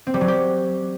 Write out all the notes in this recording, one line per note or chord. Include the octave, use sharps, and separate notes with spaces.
C4
G3
F#3
G4